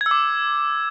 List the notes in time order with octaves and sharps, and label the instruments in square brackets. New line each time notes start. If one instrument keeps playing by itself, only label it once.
[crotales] G#6
E6
D6